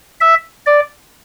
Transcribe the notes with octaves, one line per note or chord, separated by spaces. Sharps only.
E5
D5